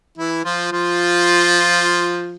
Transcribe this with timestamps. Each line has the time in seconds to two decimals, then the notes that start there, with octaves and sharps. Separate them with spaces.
0.18 E3 E4
0.44 F3 F4
0.72 F3 F4